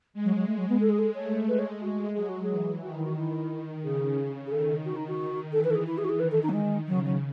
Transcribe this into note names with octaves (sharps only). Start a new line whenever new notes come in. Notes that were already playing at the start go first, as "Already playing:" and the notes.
G#3
F#3
F#3
A3
F#3
B3
A4
G#4
A4
A3 C#5
G#3 B4
C#5
G#3 F#4
F#3 G#4
F#4
G#4
E3
D#3 F#4
E4
F#4
E4
D#3
C#3 G#4
G#4
D#3 A4
F#4
D#4
F#4
E3 A4
B4
A4
G#4
E4
G#4
F#4
G#4
D#3 B4
A4
D#4
F#3
D#3 G#3
C#3 F#3
F#3